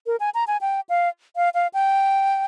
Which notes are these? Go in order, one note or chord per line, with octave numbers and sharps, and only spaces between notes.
A#4
G#5
A#5
G#5
G5
F5
F5
F5
G5